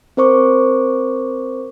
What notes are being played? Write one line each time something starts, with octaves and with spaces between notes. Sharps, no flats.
C4 A#4 C5 C#6 D6